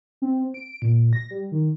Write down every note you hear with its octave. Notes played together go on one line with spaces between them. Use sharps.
C4
D7
A#2
A#6
G3
D#3